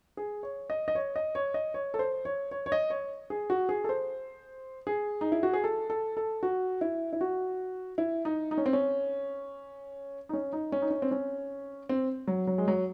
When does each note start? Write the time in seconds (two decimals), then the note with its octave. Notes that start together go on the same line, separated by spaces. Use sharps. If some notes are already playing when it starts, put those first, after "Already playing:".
0.17 G#4
0.43 C#5
0.70 D#5
0.88 D#5
0.95 C#5
1.16 D#5
1.35 C#5
1.54 D#5
1.74 C#5
1.94 A4
1.99 C5
2.25 C#5
2.51 C#5
2.66 C#5
2.72 D#5
2.90 C#5
3.30 G#4
3.50 F#4
3.69 G#4
3.84 A4
3.89 C5
4.87 G#4
5.21 D#4
5.32 E4
5.43 F#4
5.53 G#4
5.64 A4
5.90 A4
6.17 A4
6.43 F#4
6.81 E4
7.13 E4
7.21 F#4
7.98 E4
8.25 D#4
8.51 D#4
8.58 C#4
8.66 C4
8.73 C#4
10.29 D#4
10.33 C#4
10.53 D#4
10.72 C#4
10.82 D#4
10.91 C#4
11.02 C4
11.11 C#4
11.89 C4
12.27 F#3
12.47 F#3
12.58 G#3
12.68 F#3